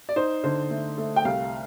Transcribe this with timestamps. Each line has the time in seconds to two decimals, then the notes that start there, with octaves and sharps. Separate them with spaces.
0.09 D5
0.16 D#4 C5
0.44 D3 C5
0.70 A3
0.98 A3
1.16 G5
1.25 C2 F5